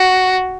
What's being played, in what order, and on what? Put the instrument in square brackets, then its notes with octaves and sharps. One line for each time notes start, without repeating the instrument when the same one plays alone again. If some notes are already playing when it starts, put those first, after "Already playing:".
Already playing: [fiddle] F#4